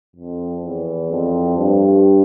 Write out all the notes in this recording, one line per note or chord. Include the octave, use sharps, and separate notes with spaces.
F2
E2
F2
G2